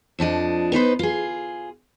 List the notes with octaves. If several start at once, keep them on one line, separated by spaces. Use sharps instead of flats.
F2 F3 D4 D#5
B3 D#4 B4 C5
F4 G#4